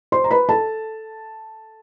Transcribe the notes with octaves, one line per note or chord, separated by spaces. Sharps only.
C5 C6
A#5
B4 B5
A4 A5